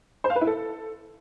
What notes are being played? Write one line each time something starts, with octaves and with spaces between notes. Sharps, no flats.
C5
F5
B4
E4
A4